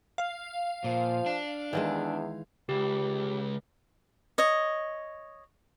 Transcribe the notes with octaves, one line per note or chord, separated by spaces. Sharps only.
F5
A#2 F3
D4
E2 D#3 E3 G#3
C#2 G4
C#5 D#5